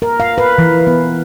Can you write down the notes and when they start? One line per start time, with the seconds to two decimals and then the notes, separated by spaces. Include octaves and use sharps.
0.02 A#4
0.20 F5
0.38 B4
0.58 E3
0.87 B3